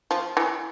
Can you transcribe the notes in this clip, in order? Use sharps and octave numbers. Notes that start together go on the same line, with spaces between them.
F3
E3